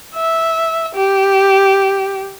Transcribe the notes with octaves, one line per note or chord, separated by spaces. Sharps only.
E5
G4